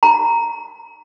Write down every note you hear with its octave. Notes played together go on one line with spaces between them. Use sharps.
A#5